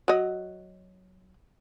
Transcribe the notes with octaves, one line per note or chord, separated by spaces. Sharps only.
F#3 D#5